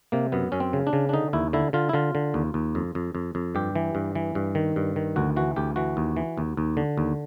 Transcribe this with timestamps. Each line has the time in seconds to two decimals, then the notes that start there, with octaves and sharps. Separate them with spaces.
0.12 C3 A#3
0.32 F#2 B3
0.52 F#2 C#4
0.60 C4
0.73 C#3
0.87 D4
0.93 C#3
1.09 D4
1.13 D3 D#4
1.33 D#2 E4
1.53 D3 E4
1.73 D3 F4
1.89 E4
1.93 D3 F4
2.15 D3
2.34 D#2
2.54 D#2
2.75 F2
2.95 F2
3.15 F2
3.35 F2
3.55 G2 G4
3.76 E3
3.95 G2
4.15 E3
4.35 G2
4.55 D#3
4.76 G2
4.96 D#3
5.16 D2 F#4
5.36 E3 F#4
5.56 D2 G4
5.76 E3 F#4
5.97 D#2
6.17 E3
6.37 D#2
6.57 D#2
6.77 D3
6.98 D#2